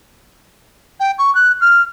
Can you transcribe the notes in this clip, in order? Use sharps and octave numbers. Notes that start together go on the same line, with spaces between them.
G5
C#6
F#6
F6